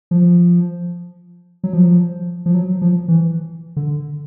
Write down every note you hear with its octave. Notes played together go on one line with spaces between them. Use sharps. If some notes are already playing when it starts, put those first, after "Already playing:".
F3
F#3
F3
F3
F#3
F3
E3
D3